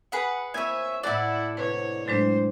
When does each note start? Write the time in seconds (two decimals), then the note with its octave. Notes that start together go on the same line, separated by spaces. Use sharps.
0.12 G#4 B4 F#5
0.54 A#3 C4 D#4 C#5 E5 G#5
1.03 A2 A3 D#4 E4 D5 F#5 F#6
1.57 C3 D4 E4 B4 C#5
2.08 A2 F#3 G#3 D4 C5